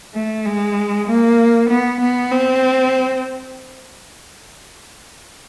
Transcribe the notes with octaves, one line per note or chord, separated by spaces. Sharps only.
A3
G#3
A#3
B3
B3
C4